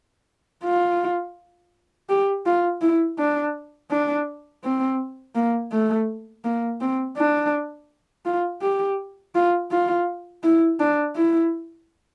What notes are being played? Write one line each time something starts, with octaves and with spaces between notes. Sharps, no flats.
F4
G4
F4
E4
D4
D4
C4
A#3
A3
A#3
C4
D4
F4
G4
F4
F4
E4
D4
E4